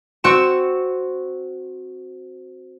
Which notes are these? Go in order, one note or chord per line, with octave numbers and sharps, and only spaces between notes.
C4 F#4 C#6 E7